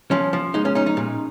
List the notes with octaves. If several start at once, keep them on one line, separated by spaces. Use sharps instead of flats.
F3 C#4
F3
G#3 D#4
C#4
C#4 D#4
D#4
A#2